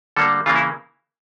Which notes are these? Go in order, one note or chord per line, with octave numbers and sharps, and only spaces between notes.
D3 G3 A#3 A4
C#3 E3 A#3 F4
E4